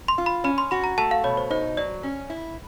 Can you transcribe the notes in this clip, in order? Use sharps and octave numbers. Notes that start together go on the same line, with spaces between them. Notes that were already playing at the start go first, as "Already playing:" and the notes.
C6
F4
B5
C#4 B5
C6
F#4 B5
A#5
A3 A5
F5
B2 C#5
C5
D#4 C5
F#3 D5
C#4
E4